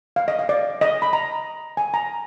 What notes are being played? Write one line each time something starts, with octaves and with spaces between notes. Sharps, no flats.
F5
D#5
F5
D5
D#5
B5
A#5
G#5
A#5